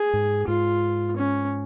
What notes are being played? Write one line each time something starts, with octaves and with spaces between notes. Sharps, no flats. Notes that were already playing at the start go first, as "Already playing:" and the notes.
Already playing: G#4
G#2
G#2 F4
C#4